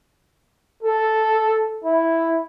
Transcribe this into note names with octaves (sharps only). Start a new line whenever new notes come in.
A4
E4